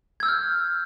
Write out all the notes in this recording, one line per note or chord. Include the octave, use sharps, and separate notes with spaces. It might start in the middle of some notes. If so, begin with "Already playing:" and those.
E6 F6 G6 G#6